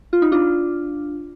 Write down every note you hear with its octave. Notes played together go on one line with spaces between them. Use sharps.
F4
D#4
D4 F4